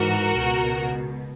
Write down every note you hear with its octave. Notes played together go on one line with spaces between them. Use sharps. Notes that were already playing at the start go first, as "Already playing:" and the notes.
Already playing: G#2 E3 F#4 A#4
C#2 B2